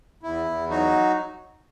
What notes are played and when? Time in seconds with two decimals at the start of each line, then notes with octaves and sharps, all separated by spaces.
0.23 E2 E4
0.46 E2
0.69 F#3 D#4 F#4